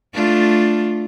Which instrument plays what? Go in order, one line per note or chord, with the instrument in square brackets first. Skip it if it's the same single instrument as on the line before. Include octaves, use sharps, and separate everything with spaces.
[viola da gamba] A3 D4 F4